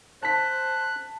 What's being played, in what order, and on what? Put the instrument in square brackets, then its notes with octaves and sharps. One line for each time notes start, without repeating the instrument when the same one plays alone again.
[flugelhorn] C5 [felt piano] A5 B6 [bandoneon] F#6